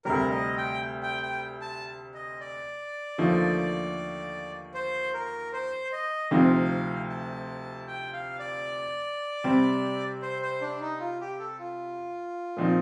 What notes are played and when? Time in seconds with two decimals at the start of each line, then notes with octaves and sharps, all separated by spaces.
0.05 D2 C3 G3 A#4
0.31 D#5
0.57 G5
1.03 G5
1.23 G5
1.61 A5
2.14 D#5
2.40 D5
3.18 D#2 D3 F3 A3 D#4
4.74 C5
5.13 A#4
5.53 C5
5.92 D#5
6.31 D2 C3 F3 C4 D#4 F5
7.09 A5
7.87 G5
8.13 F5
8.39 D5
9.44 C3 G3 C4
10.22 C5
10.42 C5
10.61 D4
10.81 D#4
11.00 F4
11.21 G4
11.39 A4
11.59 F4
12.57 A#2 F3 C4 D#4